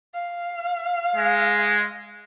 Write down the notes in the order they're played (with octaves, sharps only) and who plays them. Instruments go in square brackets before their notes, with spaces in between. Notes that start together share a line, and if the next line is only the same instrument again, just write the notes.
[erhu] F5
[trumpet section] G#3